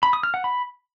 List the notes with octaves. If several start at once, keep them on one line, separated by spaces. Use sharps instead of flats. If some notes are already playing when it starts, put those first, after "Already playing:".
B5
D#6
F6
F#5
B5